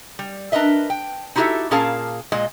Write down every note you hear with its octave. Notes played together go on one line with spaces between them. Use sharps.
G3
D4 A#4 B4 D#5 E5
G5
D#4 E4 F#4 G4 A4 E5
A#2 C#4 G#4 A#4 F5 A5
A#2 G#3 D#5